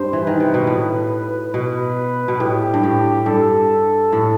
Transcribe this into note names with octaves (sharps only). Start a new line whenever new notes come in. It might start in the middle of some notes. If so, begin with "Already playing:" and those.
Already playing: G2 C5
E3
D#3 B4
C3
B2
A2
B2 B4
B2
A2 G4
G2
A2
G2 A4
A2